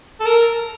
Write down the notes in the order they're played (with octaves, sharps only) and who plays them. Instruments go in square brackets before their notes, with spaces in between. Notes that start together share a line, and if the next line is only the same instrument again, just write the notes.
[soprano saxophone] A4
A#4